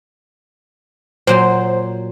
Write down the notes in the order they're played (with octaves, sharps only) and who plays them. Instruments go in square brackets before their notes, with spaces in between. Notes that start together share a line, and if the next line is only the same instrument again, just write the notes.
[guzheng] A#2 F#3 C6 [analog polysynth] C5